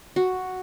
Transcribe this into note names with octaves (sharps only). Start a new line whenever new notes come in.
F#4